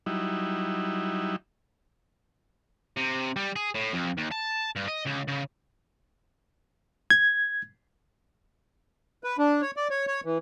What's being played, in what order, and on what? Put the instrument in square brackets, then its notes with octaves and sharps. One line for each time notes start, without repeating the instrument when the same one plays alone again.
[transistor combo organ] F#3 G3 D#4 E4
[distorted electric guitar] C3
G3
G#4
A2
F2
D#2
A5
G2
D#5
C#2
C#3
[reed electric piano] G#6
[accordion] B4
D4
C#5
D5
C#5
C#5
E3